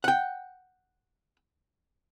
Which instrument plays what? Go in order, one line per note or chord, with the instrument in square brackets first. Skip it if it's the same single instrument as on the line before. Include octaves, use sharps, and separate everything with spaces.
[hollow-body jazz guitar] F#5 G5